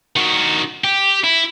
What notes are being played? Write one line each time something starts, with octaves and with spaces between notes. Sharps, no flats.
D#3 F#4
G4
E4